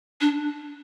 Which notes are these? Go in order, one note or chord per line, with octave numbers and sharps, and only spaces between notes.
D4